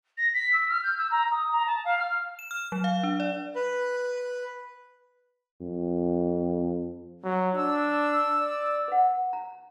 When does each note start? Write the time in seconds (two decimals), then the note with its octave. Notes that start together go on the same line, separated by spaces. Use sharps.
0.17 A#6
0.34 B6
0.53 E6
0.68 F6
0.83 G6
0.98 E6
1.11 A#5
1.31 D#6
1.52 A#5
1.66 A5
1.85 F5
1.99 F6
2.39 E7
2.51 F6
2.72 F#3
2.84 F5
3.03 D4
3.20 D5
3.55 B4
5.61 F2
7.24 F#3
7.56 D4 E6
8.40 D5
8.88 B4 F#5
9.33 A#5